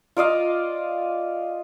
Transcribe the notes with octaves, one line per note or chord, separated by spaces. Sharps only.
F4 D5 D#5 F5